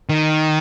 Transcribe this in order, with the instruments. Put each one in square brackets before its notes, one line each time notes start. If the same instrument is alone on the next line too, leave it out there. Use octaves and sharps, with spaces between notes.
[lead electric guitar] D#3